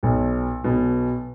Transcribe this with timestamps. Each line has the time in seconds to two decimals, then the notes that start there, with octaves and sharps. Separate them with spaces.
0.03 B1 B2
0.64 B1 B2